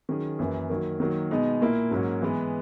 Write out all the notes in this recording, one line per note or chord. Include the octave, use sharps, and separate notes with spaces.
D#3 F#3 C#4 G#4
F#2 E3 A#3
D#3 F#3 A#3
D#3 F#3 A#3
B2 G#3 B3 D#4
A#2 A#3 E4
G#2 F#3 A#3 C#4
E3 G#3 B3